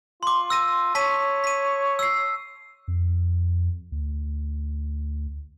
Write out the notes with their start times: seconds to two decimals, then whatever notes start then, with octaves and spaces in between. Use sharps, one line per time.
0.23 F4 C6 D6
0.50 E6 A#6 D#7
0.95 C#5 A5 B6 D#7
1.44 B6 D#7
1.99 E6 C7
2.88 F2
3.92 D2